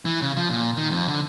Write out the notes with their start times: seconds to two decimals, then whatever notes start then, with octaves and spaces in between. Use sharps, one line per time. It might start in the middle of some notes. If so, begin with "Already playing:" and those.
0.05 E3
0.22 C#3
0.37 F3
0.50 A#2
0.77 D#3
0.91 F2
1.08 D3